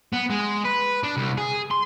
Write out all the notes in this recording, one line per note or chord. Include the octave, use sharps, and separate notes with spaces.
B3
G#3
B4
D4
C2
G#4
C6